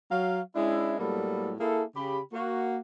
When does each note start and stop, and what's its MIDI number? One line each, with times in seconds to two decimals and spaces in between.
0.11 0.41 54
0.11 0.41 77
0.55 0.98 56
0.55 0.98 61
0.55 0.98 62
0.55 0.98 64
0.99 1.54 45
0.99 1.54 54
0.99 1.54 55
0.99 1.54 58
0.99 1.54 59
0.99 1.54 69
1.59 1.83 58
1.59 1.83 64
1.59 1.83 68
1.59 1.83 69
1.96 2.20 49
1.96 2.20 67
1.96 2.20 83
2.33 2.77 58
2.33 2.77 66